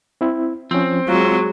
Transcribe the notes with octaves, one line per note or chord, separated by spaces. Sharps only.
C4 E4
F3 C4 C#4
F#3 G#3 F4